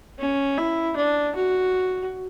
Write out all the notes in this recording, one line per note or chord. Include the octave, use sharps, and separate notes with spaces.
C#4
E4
D4
F#4